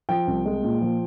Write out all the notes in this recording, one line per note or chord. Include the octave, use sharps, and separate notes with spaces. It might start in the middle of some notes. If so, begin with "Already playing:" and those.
F3 G5
C2
G#3
A#2
F3